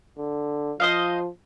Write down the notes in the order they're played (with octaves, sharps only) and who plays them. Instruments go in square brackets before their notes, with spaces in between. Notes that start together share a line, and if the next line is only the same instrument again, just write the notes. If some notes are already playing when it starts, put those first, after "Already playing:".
[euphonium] D3
[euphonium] F3 [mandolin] C5 D#5 F5